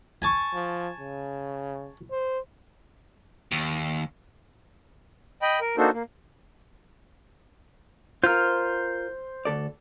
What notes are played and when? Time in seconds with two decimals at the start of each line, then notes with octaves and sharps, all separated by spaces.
0.22 G#5 A5 C#6
0.54 F3
1.00 C#3
2.11 C5
3.52 D#2
5.42 D#5 G5 B5
5.61 A#4
5.78 A#3 D4 D#4 F#4 A4 C5
5.94 A#3
8.24 F4 A#4 C5 F6
9.45 D2 A4 D5